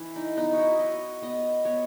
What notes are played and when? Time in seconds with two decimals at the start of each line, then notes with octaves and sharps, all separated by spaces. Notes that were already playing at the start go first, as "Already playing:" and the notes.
Already playing: E3
0.16 D#4
0.37 B3 D#4
0.53 E4 F#4
0.79 F#3 D#5
1.22 B3 D#5
1.65 B3 C#5